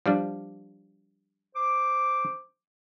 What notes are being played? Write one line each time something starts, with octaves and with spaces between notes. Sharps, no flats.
F3 G3 D4
C5 D6